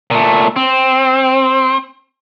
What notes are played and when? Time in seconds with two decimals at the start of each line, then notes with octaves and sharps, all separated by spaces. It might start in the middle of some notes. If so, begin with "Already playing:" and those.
0.11 A#2 A3
0.56 C4